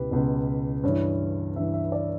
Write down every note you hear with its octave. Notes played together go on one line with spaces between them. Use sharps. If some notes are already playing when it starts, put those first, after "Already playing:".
Already playing: C#2 B2 E4 G4 B4
C#2 B2
G2 E3 C#5
G2 E3 E5
E5
D5